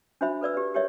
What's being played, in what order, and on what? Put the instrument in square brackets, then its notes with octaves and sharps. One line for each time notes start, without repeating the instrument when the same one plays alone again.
[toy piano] D4 F#4 C5 E5 B5
A4 B4 D5 E6
G4 B4
G4 A#4 C#5 D5 E5